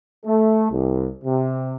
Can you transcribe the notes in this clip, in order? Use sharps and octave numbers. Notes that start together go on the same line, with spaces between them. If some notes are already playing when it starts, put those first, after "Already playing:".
A3
C2
C3